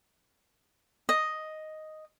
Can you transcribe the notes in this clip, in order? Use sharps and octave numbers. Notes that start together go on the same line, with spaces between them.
D#5